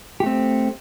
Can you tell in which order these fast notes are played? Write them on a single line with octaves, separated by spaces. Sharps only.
G4 A3 C4